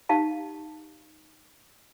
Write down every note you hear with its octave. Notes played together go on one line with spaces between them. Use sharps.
D#4 G4 F5 A5